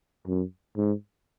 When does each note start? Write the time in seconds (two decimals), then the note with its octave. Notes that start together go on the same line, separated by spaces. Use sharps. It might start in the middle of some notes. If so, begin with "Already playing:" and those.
0.28 F#2
0.77 G#2